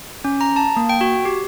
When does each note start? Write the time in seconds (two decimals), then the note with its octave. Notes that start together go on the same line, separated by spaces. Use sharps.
0.24 C#4
0.41 A#5
0.56 A5
0.77 A#3
0.89 G5
1.01 F#4
1.25 G4